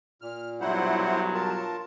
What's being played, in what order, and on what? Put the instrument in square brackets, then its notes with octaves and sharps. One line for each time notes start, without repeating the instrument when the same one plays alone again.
[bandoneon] A#2 [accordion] F6
[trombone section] B1 G2 F#3 [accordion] E4 C5 F#5
[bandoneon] F4 A#4 [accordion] A5